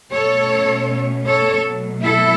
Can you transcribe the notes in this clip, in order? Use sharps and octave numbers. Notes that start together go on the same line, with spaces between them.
B2 A3 C#4 A4 C#5
A4 C#5
B2 F#3 A3
E4 A4